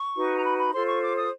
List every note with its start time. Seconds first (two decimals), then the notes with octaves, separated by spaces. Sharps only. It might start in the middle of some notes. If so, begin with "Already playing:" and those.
Already playing: C#6
0.15 D#4 F#4 B4
0.35 A#5
0.44 B5
0.58 B5
0.72 F4 A4 C5 C6
0.87 C#6
1.02 D6
1.17 D#6